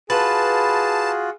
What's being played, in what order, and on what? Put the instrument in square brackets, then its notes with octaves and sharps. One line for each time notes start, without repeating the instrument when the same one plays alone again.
[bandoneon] F4 F#4 [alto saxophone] G#4 [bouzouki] B4 [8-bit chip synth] A5